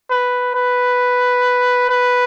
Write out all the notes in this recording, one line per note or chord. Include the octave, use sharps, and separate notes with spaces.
B4
B4
B4